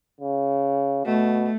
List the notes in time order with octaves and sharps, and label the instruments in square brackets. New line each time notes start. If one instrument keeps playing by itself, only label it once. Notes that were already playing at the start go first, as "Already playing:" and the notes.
[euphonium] C#3
[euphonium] B2 [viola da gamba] A3